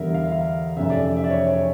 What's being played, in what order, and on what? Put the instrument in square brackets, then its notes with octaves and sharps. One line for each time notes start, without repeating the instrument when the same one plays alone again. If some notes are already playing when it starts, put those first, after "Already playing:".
Already playing: [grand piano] E2 D3 G3 A#4 E5
F5
E5
F5
F1 F2 C#3 E5
D5
E5
E5
D5
C#5
C#5